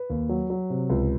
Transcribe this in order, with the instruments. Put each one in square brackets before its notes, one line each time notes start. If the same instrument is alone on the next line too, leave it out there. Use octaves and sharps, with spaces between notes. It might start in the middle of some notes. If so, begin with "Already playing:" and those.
Already playing: [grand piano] B4
D#2
F#3
F#3
C3
C#2